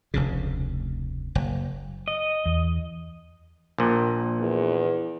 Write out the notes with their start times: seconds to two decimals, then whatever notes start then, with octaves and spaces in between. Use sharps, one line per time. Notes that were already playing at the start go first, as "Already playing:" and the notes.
0.14 F1 D2 C#3
1.35 F#1
2.08 D#5
2.46 E2
3.78 A#1 A#2
4.40 E2